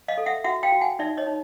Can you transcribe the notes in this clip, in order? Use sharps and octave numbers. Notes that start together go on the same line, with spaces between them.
D#5 F5
A4
E5 F#5
F#4 E5 F#5
F5 G5
F#4
F#5 G#5
D#4 D5 E5
C#5 D#5
D#4